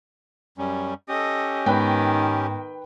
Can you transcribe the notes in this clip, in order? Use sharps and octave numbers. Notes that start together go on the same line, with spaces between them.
F#2 G3 C#4
C#4 G4 A4 D#5
G#2 D#3 B3 B4 G5